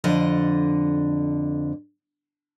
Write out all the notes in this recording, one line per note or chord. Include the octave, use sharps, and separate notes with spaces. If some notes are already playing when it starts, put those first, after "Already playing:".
F2 D3 D#5